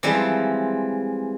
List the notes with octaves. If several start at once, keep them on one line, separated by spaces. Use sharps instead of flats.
E3 F3 G3 G#3 C4